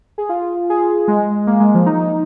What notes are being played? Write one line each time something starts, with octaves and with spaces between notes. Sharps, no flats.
G#4
F4
G#4
G#3
A#3
G#3
F3
D#4